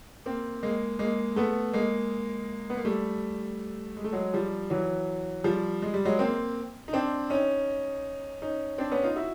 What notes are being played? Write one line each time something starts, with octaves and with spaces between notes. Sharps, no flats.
A#3 C4
G#3 A#3
G#3 A#3
A3 B3
G#3 A#3
B3
A#3
G3 A3
G#3
A3
F#3 G#3
F3 G3
E3 F#3
F3 G3
G#3
G3
F#3 G#3
A#3 C4
D#4
C4 D4
C#4 D#4
C#4 D#4
C4 D4
B3 C#4
D#4 F4
E4 F#4